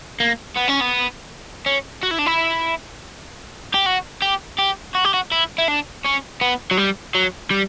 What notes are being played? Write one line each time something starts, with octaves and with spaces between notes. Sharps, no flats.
A#3
B3
C#4
B3
C#4
F#4
E4
D4
E4
G4
F#4
G4
G4
F#4
G4
F#4
E4
E4
D4
C#4
B3
F#3
G3
F#3
G3